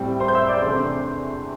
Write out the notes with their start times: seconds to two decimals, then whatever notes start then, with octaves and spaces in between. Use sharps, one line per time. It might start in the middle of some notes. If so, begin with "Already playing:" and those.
Already playing: A2 G3 C4
0.20 C5 C6
0.28 G6
0.35 E5 E6
0.48 D5 D6
0.62 E2 C3 A3 D4 C5 C6